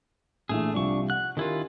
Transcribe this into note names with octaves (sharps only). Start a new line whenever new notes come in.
A#1 E3 A3 G#4
C2 F3 G3 D4 C#6
F#5 F#6
D#3 C#4 E4 F4 G4 A#4